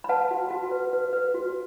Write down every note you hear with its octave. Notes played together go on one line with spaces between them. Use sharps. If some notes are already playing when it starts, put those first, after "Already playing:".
B5
B4 F#5 A5
F#4
F#4
B4
B4
B4
F#4